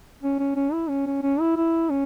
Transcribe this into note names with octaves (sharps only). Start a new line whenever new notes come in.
C#4
C#4
C#4
E4
C#4
C#4
C#4
E4
E4
C#4